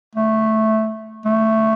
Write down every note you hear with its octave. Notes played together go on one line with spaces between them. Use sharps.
A3
A3